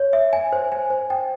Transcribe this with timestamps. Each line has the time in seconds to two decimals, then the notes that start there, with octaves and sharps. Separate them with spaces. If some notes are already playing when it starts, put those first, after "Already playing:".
Already playing: C#5
0.13 E5
0.33 G#5
0.53 C5
0.72 G#5
0.90 C5
1.10 G5